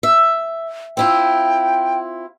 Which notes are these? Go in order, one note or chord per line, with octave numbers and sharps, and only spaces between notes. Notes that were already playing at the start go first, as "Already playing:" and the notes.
E5
C4 E4 F4 G5